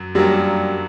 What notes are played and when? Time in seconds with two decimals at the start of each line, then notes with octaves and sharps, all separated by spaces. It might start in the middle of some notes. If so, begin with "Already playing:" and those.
Already playing: F#2 F#3
0.15 F#2 F#3 G3 A#3 D4